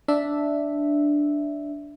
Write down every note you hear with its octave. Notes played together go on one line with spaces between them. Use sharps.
D4 E5